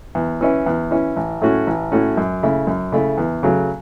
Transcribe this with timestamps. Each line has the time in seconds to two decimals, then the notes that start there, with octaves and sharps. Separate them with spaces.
0.15 E2
0.41 E3 C#4 E4
0.66 E2
0.91 E3 C#4 E4
1.16 A1
1.42 A2 A3 C#4 F#4
1.67 A1
1.92 A2 A3 C#4 F#4
2.17 F#2
2.43 C#3 A3 E4
2.67 F#2
2.92 C#3 A3 E4
3.18 E2
3.43 C#3 F#3 A3